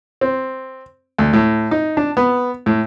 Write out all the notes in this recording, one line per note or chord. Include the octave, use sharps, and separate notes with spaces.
C4
D2
A2
D#4
D4
B3
A2